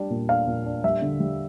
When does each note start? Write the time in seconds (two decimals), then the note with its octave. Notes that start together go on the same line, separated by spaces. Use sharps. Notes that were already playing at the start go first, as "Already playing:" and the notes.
Already playing: G3 D4
0.10 A#2
0.29 D4 F5
0.47 A#2
0.66 D4
0.84 G3 E5
1.02 D3
1.20 G3